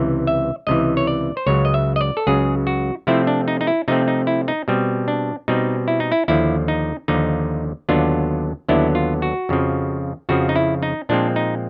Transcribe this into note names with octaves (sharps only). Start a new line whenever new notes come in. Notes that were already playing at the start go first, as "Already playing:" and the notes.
Already playing: C#2 C3 E3
E5
C#2 C3 E3 D#5
C#5
D5
C5
C#2 C#3 F#3 C#5
D#5
E5
D#5
D5
A4
C#2 C#3 F#3 G#4
F#4
C3 F3 A3 C4 E4
D4
D#4
D#4
E4
C3 F3 A3 C4 D#4
D#4
E4
D#4
B2 G3 C4
D4
B2 G3 C4 D#4
E4
D#4
E4
D#2 D3 F3 E4
D#4
D#2 D3 F3 D#4
D#2 D3 F#3 B3 D4 F4
D#2 D3 F#3 B3 D4 E4
F4
F#4
F2 C#3 F3
F2 C#3 F3 F#4
D#4
E4
D#4
A#2 F3 G#3 C4 D4
D#4